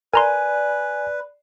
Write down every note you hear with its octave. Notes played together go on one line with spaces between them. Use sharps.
A#4 B4 D5 G#5 A#5 C6